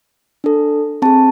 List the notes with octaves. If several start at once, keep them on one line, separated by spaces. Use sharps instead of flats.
D4 A4
C4 G#4 A5